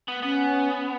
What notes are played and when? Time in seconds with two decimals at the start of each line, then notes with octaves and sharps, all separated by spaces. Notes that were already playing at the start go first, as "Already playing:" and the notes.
0.08 B3
0.22 B3 C#4